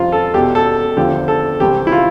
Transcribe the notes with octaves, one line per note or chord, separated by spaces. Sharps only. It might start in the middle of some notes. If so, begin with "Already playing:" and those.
Already playing: F2 C3 F3 F4
A4
E2 B2 G4
A4
E2 D3 F3 G4
A4
C2 C3 E3 G4
E4
F4